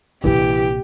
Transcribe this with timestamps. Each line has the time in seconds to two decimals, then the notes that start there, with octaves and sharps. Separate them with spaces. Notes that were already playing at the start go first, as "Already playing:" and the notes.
0.24 A#1 C3 E3 G4